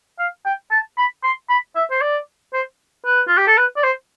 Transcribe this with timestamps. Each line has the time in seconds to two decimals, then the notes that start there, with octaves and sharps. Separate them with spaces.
0.19 F5
0.45 G5
0.71 A5
0.98 B5
1.24 C6
1.50 B5
1.76 E5
1.91 C5
2.01 D5
2.53 C5
3.05 B4
3.28 F4
3.37 G4
3.47 A4
3.58 B4
3.76 D5
3.84 C5